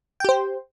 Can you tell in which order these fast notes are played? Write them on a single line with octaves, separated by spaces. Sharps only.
G5 G4 C5